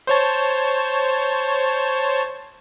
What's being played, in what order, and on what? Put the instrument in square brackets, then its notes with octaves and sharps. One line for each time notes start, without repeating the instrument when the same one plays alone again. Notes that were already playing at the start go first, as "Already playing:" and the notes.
[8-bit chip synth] C5 C#5 A5